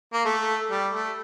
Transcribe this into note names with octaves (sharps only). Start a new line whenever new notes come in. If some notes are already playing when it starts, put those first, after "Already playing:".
A#3
A3
G3
A3